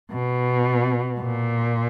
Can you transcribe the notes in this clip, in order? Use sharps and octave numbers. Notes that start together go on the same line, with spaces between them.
B2
A#2